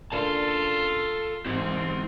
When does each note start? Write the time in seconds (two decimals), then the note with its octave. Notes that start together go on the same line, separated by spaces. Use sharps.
0.12 C#3 A#3 D4 F4 A4 A5
1.46 G#2 E3 C4 E4 G4